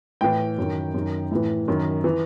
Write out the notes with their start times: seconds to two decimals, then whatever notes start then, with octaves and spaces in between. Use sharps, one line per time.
0.21 A2 E3 G5
0.58 F#2 D#3
0.94 F#2 D#3
1.31 A2 E3
1.68 F#2 D#3
2.04 E3